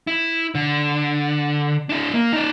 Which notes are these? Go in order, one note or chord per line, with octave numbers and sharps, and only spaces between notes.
E4
D3
D4 E4
A#3
D#4 D5